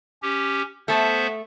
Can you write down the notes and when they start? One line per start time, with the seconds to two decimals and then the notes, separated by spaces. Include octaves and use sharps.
0.22 C#4 G4
0.88 A3 B3 C5 E5 A5